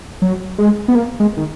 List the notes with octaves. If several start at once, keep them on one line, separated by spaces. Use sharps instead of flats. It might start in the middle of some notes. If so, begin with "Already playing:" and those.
F#3
G#3
B3
A#3
G#3
D#3